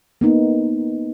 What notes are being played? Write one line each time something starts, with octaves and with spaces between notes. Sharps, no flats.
A#3 B3 D#4